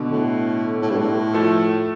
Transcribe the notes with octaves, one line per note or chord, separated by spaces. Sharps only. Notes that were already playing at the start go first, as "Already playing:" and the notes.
Already playing: B2 D3
A2
A2
G2
A2
F3 A3